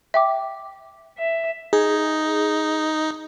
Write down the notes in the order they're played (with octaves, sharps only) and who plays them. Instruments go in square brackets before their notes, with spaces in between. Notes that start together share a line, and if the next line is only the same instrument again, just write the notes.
[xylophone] E5 G5 D6
[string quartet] E5
[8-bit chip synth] D#4 [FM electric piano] G#4